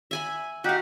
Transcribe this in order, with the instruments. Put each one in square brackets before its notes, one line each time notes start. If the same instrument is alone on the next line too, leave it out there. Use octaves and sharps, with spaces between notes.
[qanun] E5 G#5 B5
[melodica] D#4 G4 F#5 [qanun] F#4 F5